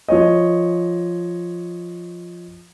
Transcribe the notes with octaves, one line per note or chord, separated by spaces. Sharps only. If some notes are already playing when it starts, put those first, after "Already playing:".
F3 C#5 D#5